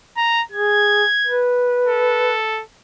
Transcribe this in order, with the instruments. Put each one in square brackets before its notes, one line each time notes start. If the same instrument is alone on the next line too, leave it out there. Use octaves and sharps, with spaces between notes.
[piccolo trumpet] A#5
[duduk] G#4 [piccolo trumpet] G#6
[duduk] B4
[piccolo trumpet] A4